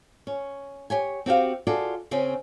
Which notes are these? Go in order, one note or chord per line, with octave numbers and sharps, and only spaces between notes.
C#4
G4 C#5 G#5
C4 F#4 G4 F5
F4 F#4 G#4 A4 D5
C#3 C4 C#4